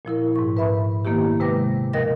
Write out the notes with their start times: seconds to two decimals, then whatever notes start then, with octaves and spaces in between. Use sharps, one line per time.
0.05 A#2 F3 E4 A#4
0.36 G#2 C#6
0.57 B4 E5 B5 C#6
1.05 D#3 A#3 B3 E4 G4
1.40 C3 G#3 B4 G5 D6 A#6
1.93 D#2 B2 F3 A#4 D#5 A#6